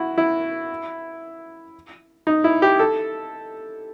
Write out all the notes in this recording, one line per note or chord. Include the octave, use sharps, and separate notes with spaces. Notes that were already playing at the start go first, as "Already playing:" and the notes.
Already playing: E4 F#4
E4
D#4
E4
G4
A4